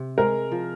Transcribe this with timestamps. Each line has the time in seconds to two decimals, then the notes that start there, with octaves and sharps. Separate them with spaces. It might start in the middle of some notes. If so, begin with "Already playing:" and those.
Already playing: C3
0.18 G#3 A#4
0.52 F3